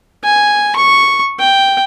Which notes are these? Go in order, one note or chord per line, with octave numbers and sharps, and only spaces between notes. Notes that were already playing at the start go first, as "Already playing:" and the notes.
G#5
C#6
G5